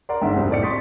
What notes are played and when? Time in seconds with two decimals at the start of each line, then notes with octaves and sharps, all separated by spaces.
0.09 A#4 D5 F#5 A#5 C6
0.21 G1 G#2 E5
0.36 F1 C2 C4
0.51 A2 D5 C#7
0.63 C6 C#6 D#6 A6 B6